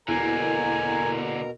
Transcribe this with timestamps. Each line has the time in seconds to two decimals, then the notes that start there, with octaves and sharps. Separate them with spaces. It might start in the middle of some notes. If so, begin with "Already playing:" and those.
0.08 E2 B2 D3 A#3 A#4 G#5 A#5